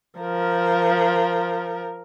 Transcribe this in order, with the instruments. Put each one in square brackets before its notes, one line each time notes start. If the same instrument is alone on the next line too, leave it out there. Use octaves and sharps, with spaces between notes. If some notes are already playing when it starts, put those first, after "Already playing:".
[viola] F3 A#4